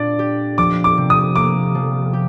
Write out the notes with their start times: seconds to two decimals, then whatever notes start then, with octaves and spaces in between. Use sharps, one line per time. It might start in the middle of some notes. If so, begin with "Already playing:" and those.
Already playing: A#2 D4 D5
0.19 G4
0.58 F3 D6
0.84 D6
0.98 C3
1.10 D#6
1.35 A#3 D6
1.75 F3
2.13 G4